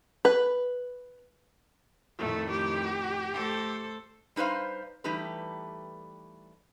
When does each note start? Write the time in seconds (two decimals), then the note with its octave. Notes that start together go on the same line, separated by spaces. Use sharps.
0.25 B4
2.19 F2 A2 D#3 A3
2.51 G4
3.33 A3 A4 C5
4.36 G3 D#4 B4 C5 F5
5.04 E3 G3 A3 D#4 G4 B4